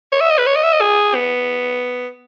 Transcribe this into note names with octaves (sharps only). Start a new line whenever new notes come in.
C#5
E5
D#5
B4
C#5
D#5
E5
D#5
G#4
B3